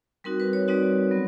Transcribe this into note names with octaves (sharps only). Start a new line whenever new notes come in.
G3 C4 D#4 F#4 A#4
B4
C#5
G3 C4 D#4 F#4 D5
F#3 B3